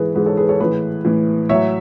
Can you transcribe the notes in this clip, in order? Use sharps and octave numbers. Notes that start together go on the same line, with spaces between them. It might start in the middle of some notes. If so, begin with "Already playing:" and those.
Already playing: G#2 E3 G#4 B4
G#2 E3 G#4 B4
A4 C#5
G#4 B4
A4 C#5
A2 E3 G#4 B4
A2 E3
A2 F#3 C#5 E5